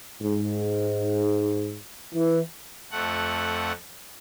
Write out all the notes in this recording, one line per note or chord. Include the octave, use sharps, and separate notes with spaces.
G#2
E3
F2 A3 F#5